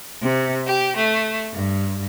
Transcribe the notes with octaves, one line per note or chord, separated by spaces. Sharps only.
C3
G4
A3
G2